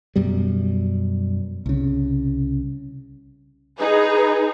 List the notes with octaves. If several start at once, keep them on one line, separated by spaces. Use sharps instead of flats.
F#2 B2 G3
C2 C#3
D#4 G#4 B4